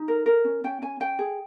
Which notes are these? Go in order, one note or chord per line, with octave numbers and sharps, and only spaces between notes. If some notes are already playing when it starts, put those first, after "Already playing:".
Already playing: D#4
A#4
A#4
C#4
C#4 G5
C#4 G#5
C#4 G5
G#4